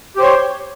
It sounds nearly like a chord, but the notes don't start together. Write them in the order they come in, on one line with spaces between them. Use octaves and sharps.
G4 C5 C#5